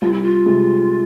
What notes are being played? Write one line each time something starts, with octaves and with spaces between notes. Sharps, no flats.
C2 F4
E4
F4
C3 G#3